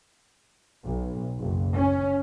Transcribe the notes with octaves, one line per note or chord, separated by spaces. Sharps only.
B1
F#1
C#4